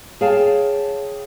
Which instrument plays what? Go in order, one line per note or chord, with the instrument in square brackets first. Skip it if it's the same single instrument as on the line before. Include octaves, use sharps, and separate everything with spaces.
[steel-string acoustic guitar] G#4 C#5 F5 G5 A5